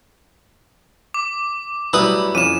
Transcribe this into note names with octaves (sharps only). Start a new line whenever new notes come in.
D6
A2 F#3 G3 E4 B4 D#6
F2 E3 C#4 D#7 E7